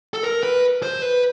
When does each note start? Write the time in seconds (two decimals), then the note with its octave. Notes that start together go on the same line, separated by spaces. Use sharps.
0.14 A4
0.23 A#4
0.43 B4
0.83 C5
1.02 B4